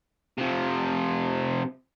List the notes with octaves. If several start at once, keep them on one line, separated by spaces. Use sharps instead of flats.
C3 F3